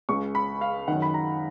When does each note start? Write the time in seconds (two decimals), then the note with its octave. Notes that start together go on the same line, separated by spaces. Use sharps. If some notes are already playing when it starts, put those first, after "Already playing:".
0.09 C#2 C#3 C#6
0.35 B5
0.61 F5
0.88 F#2 D#3 F#5
1.02 B5
1.14 A#5